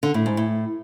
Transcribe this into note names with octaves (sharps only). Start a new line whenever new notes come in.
D3
A2
G#2
A2